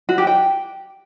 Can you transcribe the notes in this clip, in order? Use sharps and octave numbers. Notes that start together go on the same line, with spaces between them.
F#4
G4
G5